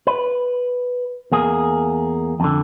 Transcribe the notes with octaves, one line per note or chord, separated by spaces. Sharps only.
B4
E2 A#3 G#4
F2 D3